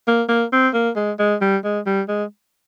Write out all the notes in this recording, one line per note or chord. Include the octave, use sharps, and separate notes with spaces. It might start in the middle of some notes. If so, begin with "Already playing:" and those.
A#3
A#3
C4
A#3
G#3
G#3
G3
G#3
G3
G#3